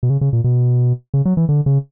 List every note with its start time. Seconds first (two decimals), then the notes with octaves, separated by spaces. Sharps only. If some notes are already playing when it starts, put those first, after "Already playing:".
0.03 B2
0.10 C#3
0.21 C#3
0.33 A#2
0.44 B2
1.14 C#3
1.25 F#3
1.37 E3
1.49 D3
1.66 C#3